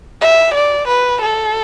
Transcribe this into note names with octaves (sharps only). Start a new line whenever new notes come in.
E5
D5
B4
A4